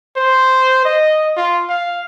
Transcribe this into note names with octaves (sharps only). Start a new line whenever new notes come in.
C5
D#5
F4
F5